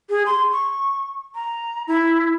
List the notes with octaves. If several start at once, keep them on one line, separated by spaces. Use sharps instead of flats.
G#4
C6
C#6
A#5
E4